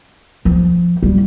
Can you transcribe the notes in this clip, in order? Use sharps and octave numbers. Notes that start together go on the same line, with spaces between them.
F3
G3